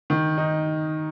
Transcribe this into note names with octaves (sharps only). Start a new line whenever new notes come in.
D#3
D#4